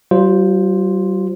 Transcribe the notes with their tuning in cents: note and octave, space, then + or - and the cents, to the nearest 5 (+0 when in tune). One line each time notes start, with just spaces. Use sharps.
G3 -45 F4 +0 C5 +0